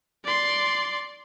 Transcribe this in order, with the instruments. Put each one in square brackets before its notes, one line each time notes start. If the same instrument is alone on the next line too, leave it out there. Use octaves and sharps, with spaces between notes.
[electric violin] D5 C6